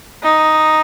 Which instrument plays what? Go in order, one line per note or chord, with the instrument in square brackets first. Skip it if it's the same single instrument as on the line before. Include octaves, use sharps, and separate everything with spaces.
[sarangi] D#4